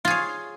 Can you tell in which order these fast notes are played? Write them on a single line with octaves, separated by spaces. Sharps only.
F4 G#4 C#5